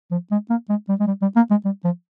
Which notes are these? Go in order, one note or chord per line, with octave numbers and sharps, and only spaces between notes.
F3
G#3
A#3
G#3
G3
G#3
G3
G3
A#3
G#3
G3
F3